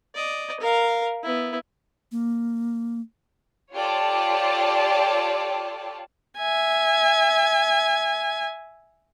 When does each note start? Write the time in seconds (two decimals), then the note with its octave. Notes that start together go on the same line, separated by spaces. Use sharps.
0.15 D5 D#5
0.60 A#4 F5
1.23 B3 E4
2.12 A#3
3.74 F4 G4 A4 C#5 D5 A5
6.37 E5 G#5